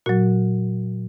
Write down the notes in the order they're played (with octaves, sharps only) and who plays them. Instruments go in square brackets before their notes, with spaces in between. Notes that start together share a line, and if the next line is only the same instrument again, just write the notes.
[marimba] A#2 F#3 F#4